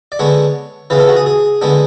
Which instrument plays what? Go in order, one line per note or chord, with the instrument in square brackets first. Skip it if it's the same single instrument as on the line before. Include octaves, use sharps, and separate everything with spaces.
[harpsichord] D5
D3 G#3 B3 D4 C#5
C#3 E3 B3 B4
A4
F#4
G#4
G#4
D3 G#3 B3 D4